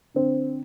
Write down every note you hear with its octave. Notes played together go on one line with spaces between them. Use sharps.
D3 C4